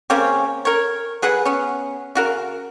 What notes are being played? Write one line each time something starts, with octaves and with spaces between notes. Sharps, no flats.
C#3 A#3 C4 C#4
A#4 C#5
F#3 G#4 B4 F#5
B3 C#4
C#3 F#4 A#4